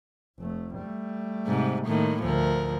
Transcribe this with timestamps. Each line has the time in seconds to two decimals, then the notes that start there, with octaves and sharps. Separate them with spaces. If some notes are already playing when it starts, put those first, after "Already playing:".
0.39 F1 A3
0.74 G3 A3
1.47 G#2 C3
1.86 A2 D#3 A#3
2.22 D2 F3 A#4